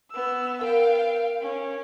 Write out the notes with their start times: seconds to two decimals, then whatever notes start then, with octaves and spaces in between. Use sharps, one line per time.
0.11 B3 E6
0.61 A#4 F5 G5
1.42 C#4